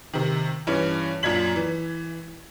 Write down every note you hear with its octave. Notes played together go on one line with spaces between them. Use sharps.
C3 D#3
G2 E3 C#4
F#2 A#2 D4 G#6 B6 F#7
E3